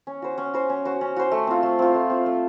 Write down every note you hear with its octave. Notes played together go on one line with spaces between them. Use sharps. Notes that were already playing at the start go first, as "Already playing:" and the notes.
C#4
F#4 C5
C#4
F#4 C5
C#4
F#4 C5
C#4
F#4 C5
A3
C4 F4
A3
C4 F4
A3
C4 F4
A3